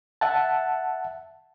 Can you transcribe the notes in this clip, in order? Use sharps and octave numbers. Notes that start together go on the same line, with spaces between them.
E5 F#5 A5